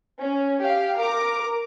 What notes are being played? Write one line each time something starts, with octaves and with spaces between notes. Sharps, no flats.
C#4
G4 F5
A#4 A#5 D6